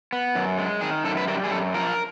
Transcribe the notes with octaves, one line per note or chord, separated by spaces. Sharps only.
B3
F#2
G#3
D#3 G#4
F#2 A4
B4
G3 A#4
G#4
F#2 A4
F3 A#4